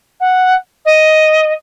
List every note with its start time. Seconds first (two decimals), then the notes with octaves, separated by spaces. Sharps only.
0.20 F#5
0.85 D#5